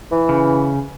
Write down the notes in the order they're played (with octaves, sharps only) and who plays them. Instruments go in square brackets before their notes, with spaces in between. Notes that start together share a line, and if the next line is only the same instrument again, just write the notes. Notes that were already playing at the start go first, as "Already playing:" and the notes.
[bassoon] E3
[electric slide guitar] C#3